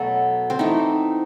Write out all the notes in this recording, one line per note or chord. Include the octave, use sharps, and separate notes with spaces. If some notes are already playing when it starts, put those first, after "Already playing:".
Already playing: B2 F#3 A3 A4
C4
E3 A3 D#4